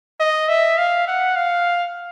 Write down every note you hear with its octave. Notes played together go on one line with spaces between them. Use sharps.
D#5
E5
F5
F#5
F5